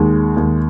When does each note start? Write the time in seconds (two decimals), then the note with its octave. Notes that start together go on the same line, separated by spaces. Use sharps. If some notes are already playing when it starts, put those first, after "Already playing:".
Already playing: D#2 G#3
0.37 D#2